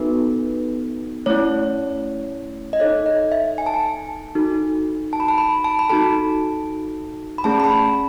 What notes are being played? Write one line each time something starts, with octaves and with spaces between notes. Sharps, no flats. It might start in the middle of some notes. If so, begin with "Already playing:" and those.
Already playing: B3 D#4 F#4 A4 B4
A3 C#4 E4 C#5
D#5
D#4 A4 C#5
D#5
E5
G#5
A5
G#5
D#4 F#4 A4
A5
B5
A5
B5
A5
B5
D#4 F#4 A4 A5
B5
A3 C#4 G#4 A5
B5
A5